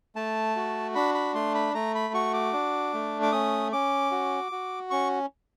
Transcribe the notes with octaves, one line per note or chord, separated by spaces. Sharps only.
A3 A5
F#4
D4 B5
B5
A3 C6
B5
A3 A#5
B5
F#4 C#6
D6
D4
A3
D6
C#4 D#6
C#4 D6
F#4
F#4
C#4 C#6